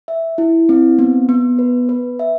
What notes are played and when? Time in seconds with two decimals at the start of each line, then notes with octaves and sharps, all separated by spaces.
0.08 E5
0.38 E4
0.69 C4
0.99 B3
1.29 B3
1.59 B4
1.89 B4
2.19 E5